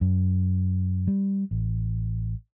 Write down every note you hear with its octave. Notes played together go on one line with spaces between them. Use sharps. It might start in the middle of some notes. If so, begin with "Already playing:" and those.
F#2
G3
A1